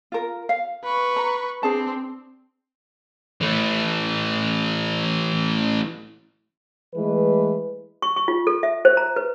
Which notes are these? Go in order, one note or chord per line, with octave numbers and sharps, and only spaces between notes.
F4 A#4
F5
B4 C#6
A#5
C4 D4 G#4 A5
E3 A3
E3 G#3 A3 B4
C#6
C#6
F4
A4
E5
C5
A#5
B4